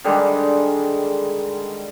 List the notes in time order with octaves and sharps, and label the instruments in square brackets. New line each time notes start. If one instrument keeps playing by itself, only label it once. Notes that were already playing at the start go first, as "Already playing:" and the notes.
[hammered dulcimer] D3 D#3 G3 G#3